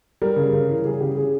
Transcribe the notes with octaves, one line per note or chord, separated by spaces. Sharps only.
G3 A#4
C#3
C#3
E3
G3 G#4
C#3 G4
C#3 G#4